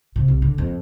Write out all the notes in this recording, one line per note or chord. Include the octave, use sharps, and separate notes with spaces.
C3
C2
D3
F2